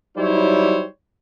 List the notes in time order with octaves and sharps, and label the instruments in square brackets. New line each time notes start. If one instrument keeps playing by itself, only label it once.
[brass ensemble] F#3 G3 D#4 E4 C5 C#5